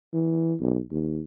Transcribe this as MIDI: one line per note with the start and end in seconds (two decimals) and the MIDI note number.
0.13 0.55 52
0.60 0.80 35
0.91 1.21 39